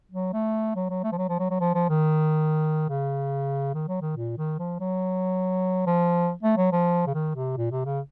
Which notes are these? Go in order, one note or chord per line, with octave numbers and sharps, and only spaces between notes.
F#3
A3
F#3
F#3
A3
F3
F#3
F3
F#3
F#3
F3
F3
D#3
C#3
D#3
F#3
D#3
A#2
D#3
F3
F#3
F3
A3
F#3
F3
C#3
D#3
C3
A#2
C3
C#3